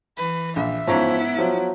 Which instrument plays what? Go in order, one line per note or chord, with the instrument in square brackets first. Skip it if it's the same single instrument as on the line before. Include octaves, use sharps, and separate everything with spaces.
[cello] E3 [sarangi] B4
[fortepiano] A#1 [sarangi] E5
[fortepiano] G#2 C#4 A#5 [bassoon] F3 [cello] B3 E4
[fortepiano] F3 [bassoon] F#3